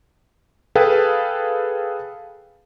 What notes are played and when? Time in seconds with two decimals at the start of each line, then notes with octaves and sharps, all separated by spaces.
0.75 G#4 A4 B4 F5 G5